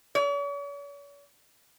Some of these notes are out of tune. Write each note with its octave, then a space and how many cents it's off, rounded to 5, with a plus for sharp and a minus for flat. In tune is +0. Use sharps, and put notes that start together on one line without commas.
C#5 +45